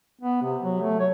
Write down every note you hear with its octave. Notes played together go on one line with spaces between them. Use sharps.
B3
C3
F#3
A3
C#5